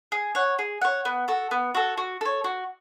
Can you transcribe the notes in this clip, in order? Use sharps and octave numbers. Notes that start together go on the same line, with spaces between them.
G#4
C#5 F#5
G#4
C#5 F#5
B3
F#4 A4
B3
F#4 A4
F#4
A4 C#5
F#4